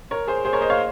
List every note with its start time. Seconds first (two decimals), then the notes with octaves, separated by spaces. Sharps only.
0.11 A#4 C#5
0.28 G#4 C5
0.45 G#4 C5
0.53 A#4 C#5
0.61 C5 D#5
0.70 C#5 F5